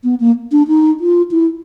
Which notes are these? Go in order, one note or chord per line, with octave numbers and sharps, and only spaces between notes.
B3
A#3
D4
D#4
F4
E4